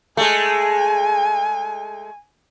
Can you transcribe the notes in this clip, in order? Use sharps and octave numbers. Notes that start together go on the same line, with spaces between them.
G#3 A3 G#5